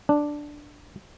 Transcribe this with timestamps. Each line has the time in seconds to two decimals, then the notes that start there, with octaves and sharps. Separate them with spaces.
0.09 D4